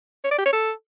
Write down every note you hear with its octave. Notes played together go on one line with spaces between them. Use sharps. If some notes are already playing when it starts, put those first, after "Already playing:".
C#5
D5
G4
C#5
A4